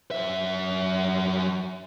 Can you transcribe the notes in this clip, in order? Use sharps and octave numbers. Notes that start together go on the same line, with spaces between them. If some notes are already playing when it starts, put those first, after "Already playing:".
F#2 E5